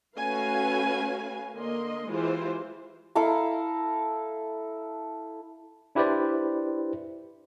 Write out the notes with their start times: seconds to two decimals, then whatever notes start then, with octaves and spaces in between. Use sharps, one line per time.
0.16 A3 C#4 F#4 B4 F5 G#5
1.54 D3 A#3 D#5 C6
2.07 E3 G#3 E4 F4 G4 C5
3.15 E4 A4 F5 A#5
5.95 D4 E4 G4 B4 C5 D5